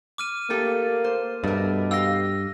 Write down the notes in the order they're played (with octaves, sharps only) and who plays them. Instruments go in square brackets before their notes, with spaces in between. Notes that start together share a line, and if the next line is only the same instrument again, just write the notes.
[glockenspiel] D6 F6 D#7
[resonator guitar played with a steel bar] A3 G4 A4 [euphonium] A#3
[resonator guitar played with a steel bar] C5
[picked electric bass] G2 [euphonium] B2 [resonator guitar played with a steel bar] A3 A#4
[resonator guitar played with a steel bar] G4 F5 [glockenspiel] E6 A#6